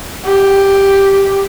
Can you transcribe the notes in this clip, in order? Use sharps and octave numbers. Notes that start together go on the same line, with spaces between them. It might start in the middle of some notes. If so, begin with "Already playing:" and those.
G4